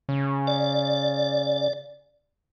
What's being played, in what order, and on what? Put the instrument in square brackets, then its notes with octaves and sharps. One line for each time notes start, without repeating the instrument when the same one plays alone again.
[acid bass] C#3
[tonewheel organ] D5